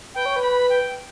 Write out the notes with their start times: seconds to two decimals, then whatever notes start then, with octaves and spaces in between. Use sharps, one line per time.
0.15 B4 G5
0.26 C#5
0.36 B4
0.42 B5
0.70 G5